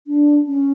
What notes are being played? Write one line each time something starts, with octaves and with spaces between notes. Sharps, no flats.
D4
C#4